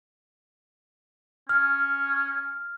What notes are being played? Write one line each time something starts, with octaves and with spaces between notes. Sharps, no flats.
C#4 F6